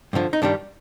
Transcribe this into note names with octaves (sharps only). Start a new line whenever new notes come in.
G2 D3 F3
D#4
G2 D#3 G3 D4